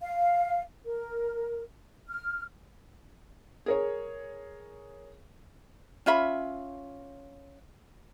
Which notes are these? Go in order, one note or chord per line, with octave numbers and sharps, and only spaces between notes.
F5
A#4
F6
G#4 A#4 C#5
C#4 F4 E5 B5